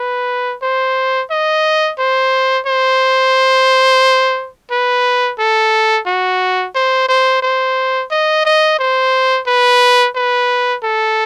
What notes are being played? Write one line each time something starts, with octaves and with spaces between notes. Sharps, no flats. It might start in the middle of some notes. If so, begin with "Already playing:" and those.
Already playing: B4
C5
D#5
C5
C5
B4
A4
F#4
C5
C5
C5
D#5
D#5
C5
B4
B4
A4